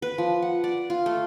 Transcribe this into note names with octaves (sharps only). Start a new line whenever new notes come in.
B4
F3
F#5
D5
F4
A3